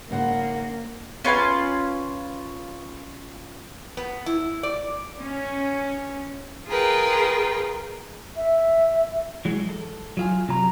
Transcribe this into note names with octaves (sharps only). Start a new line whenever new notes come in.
G#2 C#3 A#3 F#5
C#4 F4 B4 G#5
B3
E4
D5
C#4
F4 G#4 A#4 B4 G5
E5
E3 F#3 G#3
A4
F#3 F4 G#5
C3 F#3 A#5